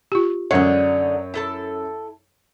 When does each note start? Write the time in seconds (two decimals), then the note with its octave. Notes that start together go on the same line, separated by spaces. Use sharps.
0.12 F4 G4
0.51 F#2 D3 D#4 C#5
1.34 E4 A4 A5